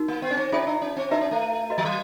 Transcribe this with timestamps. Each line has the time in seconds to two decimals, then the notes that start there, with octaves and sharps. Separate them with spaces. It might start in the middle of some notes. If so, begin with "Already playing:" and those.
Already playing: D#4 F#4 A#4
0.08 A#3
0.22 B3
0.31 C#4
0.37 C4
0.52 C#4 F4 G#4 C5 E5 G5
0.67 D4
0.82 C#4
0.97 C4
1.11 D4 F#4 B4 E5 A5
1.21 C#4
1.31 A3
1.70 F#4 B4 D#5
1.78 F3
1.85 F#3